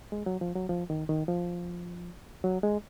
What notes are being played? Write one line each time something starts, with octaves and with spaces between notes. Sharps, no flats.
G#3
F#3
F3
F#3
F3
D#3
D#3
F3
F#3
G#3